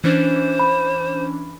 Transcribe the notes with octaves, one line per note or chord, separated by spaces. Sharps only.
E3 C#4 D4 C5
B5